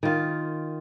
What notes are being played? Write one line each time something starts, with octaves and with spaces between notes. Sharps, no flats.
D#3 F4